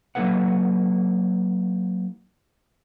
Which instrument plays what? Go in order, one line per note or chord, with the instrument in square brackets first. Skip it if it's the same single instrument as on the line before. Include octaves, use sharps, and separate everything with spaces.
[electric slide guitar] F#3 A#3 D#4 A4 B4 F#5